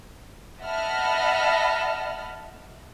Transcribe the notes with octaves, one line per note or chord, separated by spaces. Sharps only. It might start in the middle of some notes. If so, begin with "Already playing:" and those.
D#5 E5 F#5 A5 B5 F6